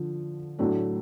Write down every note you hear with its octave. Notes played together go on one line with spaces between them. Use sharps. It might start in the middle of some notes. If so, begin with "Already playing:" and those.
Already playing: D3 F3
A2 F#3 A3 D4